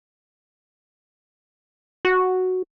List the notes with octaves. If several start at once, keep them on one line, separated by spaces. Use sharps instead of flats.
F#4